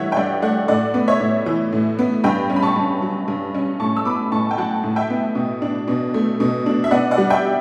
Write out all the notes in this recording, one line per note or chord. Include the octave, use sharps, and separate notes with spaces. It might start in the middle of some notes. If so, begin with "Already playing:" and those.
Already playing: G2 E3 A3 C#5 E5 F#5
G5
G2 D5 F#5
A3 D5 F#5
A2 D5 F#5
B3
C#5 E5
A2
E3
A2
B3
G2 G5 B5
C#4
B5
A5 C#6
G2
F#3
G2
C#4
A2 A5 C#6
E6
B3 B5 D6
A2 A5 C#6
G5
F#3 F#5 A5
A2
E5 G5
B3
B2
D4
B2
A3
B2
D4
E5
B3 D5 F#5
D5 F#5
G3
E5 G5